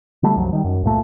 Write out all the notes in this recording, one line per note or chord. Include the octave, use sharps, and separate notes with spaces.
D3 G3 A3
C2 F#2 F3 F#3
D#3 G3
F#2
C#2 G2 A#2 A3